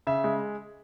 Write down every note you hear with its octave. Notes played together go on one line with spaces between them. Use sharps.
C#3 E5
G#3